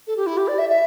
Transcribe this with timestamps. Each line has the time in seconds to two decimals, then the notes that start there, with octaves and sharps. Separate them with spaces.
0.07 A4
0.16 G4
0.26 E4
0.37 G4
0.47 D5
0.58 E5
0.69 E5